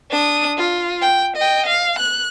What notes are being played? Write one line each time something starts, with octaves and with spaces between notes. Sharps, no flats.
D4 D#6
F4
G5
D#5 G5
F5
F#6